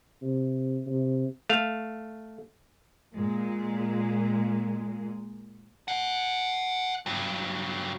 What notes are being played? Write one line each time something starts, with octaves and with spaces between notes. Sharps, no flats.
C3
C3
A3 F5
A#2 G#3
D#5 F#5
G2 F#3